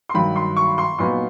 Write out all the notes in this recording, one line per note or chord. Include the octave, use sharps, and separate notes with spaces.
C6
G2 D#3 F#3 B5
C6
C#6
C6
A#2 F#3 B3 D#4 C6